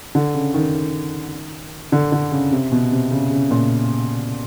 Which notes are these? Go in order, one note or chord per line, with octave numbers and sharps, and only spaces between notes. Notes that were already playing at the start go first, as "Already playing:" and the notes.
D3
C#3
D#3
D3
D3
C#3
C3
B2
C3
C#3
C#3
A#2